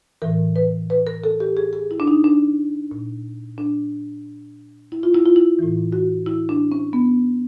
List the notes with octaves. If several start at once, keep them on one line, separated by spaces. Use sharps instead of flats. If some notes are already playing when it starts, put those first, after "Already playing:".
A2 E3 A#4
B4
B4
A#4
A4
G4
G#4
G#4
E4
D4
D#4
D4
A#2
D4
E4
F4
E4
F4
E4
A2 E3
F#4
E4
D4
C#4
B3